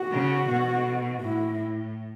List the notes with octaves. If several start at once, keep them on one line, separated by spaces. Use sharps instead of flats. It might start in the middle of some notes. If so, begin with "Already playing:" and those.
Already playing: F#4
C#3
B2
A2 E4